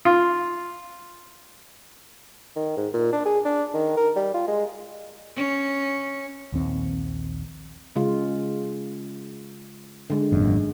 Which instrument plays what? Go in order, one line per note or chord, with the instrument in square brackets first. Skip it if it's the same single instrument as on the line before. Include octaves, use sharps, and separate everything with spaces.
[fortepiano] F4
[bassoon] D#3
G#2
A#2
D4
G#4
D4
D#3
A#4
G3
F4
G#3
[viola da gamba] C#4
[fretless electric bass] A#1 D#2 C4
[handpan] C#3 G#3 F4
D3 G#3
[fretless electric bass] G#1 F#2 A#2